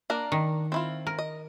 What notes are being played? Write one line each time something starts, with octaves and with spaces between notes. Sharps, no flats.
A#3 D4 A#4
D#3
C4 E4 F4
A#4
D#5